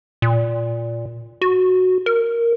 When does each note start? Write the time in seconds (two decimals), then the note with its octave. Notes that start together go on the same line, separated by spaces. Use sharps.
0.22 A#2
1.41 F#4
2.06 A#4